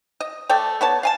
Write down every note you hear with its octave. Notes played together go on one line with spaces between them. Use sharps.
D#5
A3 A4 D5 G5
B3 C#5 A5
F5 G#5 A5